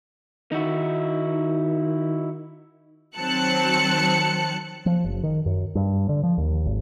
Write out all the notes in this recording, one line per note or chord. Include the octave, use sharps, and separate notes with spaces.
D#3 D#4 E4 F#4
D#3 F#3 C4 A5 F#6 C#7
F3
F#1
D#3
F#2
G2
D3
F3
D#2
G#1